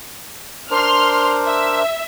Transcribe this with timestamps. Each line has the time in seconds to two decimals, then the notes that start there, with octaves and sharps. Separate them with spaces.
0.71 D4 A#4 C5 C6 F6
1.47 E5